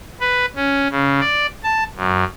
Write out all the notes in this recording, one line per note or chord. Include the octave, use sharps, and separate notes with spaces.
B4
C#4
C#3
D5
A5
F#2